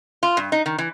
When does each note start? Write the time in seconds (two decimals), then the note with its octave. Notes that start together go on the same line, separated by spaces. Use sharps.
0.23 F4
0.37 G2
0.52 D#4
0.66 D#3
0.78 E3